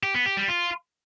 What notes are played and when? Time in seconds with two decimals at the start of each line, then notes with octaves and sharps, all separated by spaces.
0.03 G4
0.15 B3
0.26 G4
0.37 G3
0.48 F4